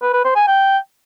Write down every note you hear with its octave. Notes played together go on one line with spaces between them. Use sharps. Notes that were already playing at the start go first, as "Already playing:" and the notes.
B4
B4
C5
G#5
G5